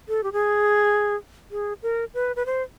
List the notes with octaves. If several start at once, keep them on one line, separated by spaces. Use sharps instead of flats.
A4
G4
G#4
G#4
A#4
B4
B4
C5